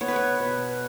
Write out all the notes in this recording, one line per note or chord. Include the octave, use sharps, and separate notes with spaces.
B3 C#5
B4
C#5
B2